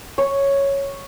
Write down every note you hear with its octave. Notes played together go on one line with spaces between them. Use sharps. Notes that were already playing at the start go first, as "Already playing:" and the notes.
C#5